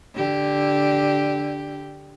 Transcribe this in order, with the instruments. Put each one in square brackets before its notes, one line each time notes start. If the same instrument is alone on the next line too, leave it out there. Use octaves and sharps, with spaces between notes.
[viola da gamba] D3 G4